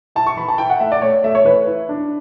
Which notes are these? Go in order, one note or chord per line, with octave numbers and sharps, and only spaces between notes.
E4 A5
C#6
E3 B5
A5
E4 G5
F#5
A3 E5
D5
A3 C#5
A3 E5
C#5
E3 B4
E4
D4